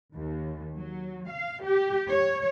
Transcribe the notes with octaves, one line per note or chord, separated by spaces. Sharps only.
D#2
F#3
F5
G4
C#5